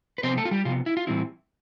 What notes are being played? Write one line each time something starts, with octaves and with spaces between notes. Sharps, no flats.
B4
C3 F3 B3 C4 C5
A3 A4
F4
G3 G4
C3 F3 B3 F4
E4
F4
A2 E3 G3 C4 E4